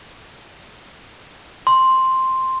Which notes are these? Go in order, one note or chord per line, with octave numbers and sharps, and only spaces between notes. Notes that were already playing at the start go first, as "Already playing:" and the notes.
C6